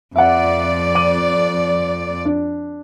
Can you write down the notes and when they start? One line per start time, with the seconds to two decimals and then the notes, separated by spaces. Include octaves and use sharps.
0.16 F2 D5 E5 F#5
0.95 D6 D#7 F#7
2.25 D4